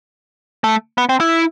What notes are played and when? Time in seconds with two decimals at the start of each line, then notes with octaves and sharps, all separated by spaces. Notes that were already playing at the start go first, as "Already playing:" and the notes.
0.64 A3
0.98 B3
1.09 C4
1.20 E4